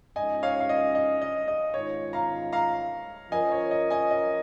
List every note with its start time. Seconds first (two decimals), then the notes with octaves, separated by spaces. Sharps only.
0.16 G#2 F3 C#4 G#4 D#5 G#5
0.43 C#5 F5
0.60 F5
0.69 D#5
0.95 D#5
1.22 D#5
1.48 D#5
1.74 G#2 D#3 C#4 F4 C#5
2.13 F5 A#5
2.52 F5 A#5
3.32 F3 C#4 A#4 D#5 G#5
3.52 C#5
3.71 D#5
3.90 D#5 G#5
4.11 D#5